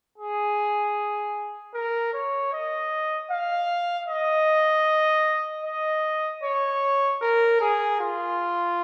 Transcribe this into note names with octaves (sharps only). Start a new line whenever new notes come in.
G#4
A#4
C#5
D#5
F5
D#5
D#5
C#5
A#4
G#4
F4